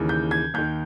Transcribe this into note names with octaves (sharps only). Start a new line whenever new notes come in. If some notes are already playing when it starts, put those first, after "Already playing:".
Already playing: D#2 C#3 E3
G6
G#6
D#2 D#3 G6